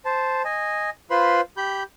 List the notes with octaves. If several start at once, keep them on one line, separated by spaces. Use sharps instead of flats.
C5 A5
D#5 G#5
F4 B4 C5 B5 C6
G4 B5 G6